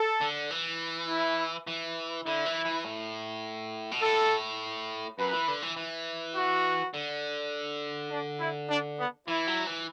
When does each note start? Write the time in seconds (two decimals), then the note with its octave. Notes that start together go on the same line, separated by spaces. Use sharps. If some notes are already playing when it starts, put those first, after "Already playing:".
Already playing: A4
0.21 D3
0.51 E3
1.09 E4
1.67 E3
2.25 D3 E4
2.45 E3
2.65 E3
2.84 A2
3.91 B2
4.01 A2 A4
5.19 F#2 B4
5.33 E3
5.48 D3
5.62 E3
5.77 E3
6.35 F#4
6.94 D3
8.11 D4
8.40 E4
8.69 D4
8.98 B3
9.28 E3 E4
9.47 F#3
9.67 E3